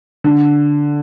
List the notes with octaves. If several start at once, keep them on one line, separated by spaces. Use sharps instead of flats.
D3